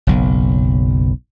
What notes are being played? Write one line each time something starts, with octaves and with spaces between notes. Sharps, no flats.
F#1 B1